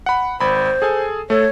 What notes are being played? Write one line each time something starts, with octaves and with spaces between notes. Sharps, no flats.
F#5 B5
G#1 C5 B5
G#4 A4 G#5
A3 A4 C#5